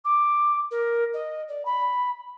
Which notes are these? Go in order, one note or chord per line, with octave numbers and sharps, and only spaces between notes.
D6
A#4
D#5
D5
B5